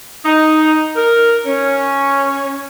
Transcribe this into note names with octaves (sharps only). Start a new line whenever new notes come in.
D#4
A#4
C#4